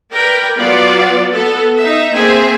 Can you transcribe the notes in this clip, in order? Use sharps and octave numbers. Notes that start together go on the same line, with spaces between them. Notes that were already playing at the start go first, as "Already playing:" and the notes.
A#4 B4 D5 G5
F#3 B3 F4 D5
B3 A4
D#4 E5
A#3 C4 G#4 E5 G#5